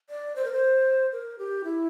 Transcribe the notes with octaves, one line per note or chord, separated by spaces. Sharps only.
D5
C5
A#4
C5
A#4
G4
E4